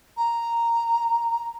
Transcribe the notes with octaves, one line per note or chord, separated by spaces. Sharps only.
A#5